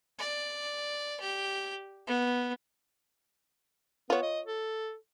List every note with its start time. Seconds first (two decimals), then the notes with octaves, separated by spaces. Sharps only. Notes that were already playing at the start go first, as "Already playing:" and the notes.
0.19 D5
1.20 G4
2.07 B3
4.10 B3 F4 C#5
4.22 D#5
4.46 A4